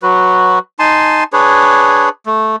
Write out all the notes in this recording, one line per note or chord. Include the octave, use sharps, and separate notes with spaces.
F#3 F#4 B4
D#4 G#5 A5 C6
D4 G#4 B4 C#5
A3